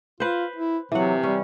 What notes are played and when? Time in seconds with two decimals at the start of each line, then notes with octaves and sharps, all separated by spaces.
0.20 F4 B4 C5
0.56 E4
0.92 C3 E3 F#3 F#5
1.23 G3 C#4